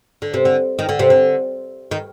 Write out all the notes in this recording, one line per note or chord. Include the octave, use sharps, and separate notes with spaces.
D3
C3
D3
D#3
D3
C3
D3
D#3